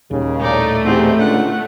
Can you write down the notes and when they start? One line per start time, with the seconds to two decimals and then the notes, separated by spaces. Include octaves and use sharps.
0.11 D#1 D#2 C#3
0.39 A2 A3 D#4 D5
0.84 E2 G#2 C4 G4
1.19 C#2 D3 F#5